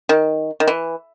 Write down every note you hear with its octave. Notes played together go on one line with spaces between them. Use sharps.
D#3
D#3
E3